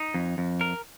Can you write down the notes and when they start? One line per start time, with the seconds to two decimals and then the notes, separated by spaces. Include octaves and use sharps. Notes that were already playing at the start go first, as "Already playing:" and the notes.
Already playing: D#4
0.14 F2
0.38 F2
0.61 A#4